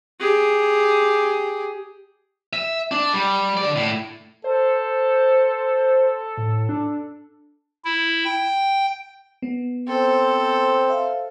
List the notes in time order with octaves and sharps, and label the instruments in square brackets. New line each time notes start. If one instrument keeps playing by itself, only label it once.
[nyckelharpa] G4 G#4
[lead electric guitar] E5
D4
G3
D3 D5
A2
[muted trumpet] A4 [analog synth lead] C5
[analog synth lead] A2
D4
[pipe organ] E4
G5
[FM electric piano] B3
[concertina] C4 [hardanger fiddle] A4 C5
[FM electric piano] E5 F5